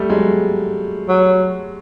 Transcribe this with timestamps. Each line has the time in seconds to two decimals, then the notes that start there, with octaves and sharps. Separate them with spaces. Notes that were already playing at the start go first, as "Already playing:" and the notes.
Already playing: G3 A3
0.09 F#3 G#3
1.08 F#3